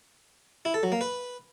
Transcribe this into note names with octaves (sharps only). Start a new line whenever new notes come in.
E4
A4
F#3
A#3
B4